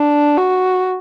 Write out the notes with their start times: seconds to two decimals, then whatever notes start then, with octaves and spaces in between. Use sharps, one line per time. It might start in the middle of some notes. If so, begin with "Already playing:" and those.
Already playing: D4
0.37 F#4